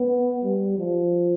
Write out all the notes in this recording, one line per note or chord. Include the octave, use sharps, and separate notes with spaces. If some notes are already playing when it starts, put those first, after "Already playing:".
Already playing: B3
G3
F3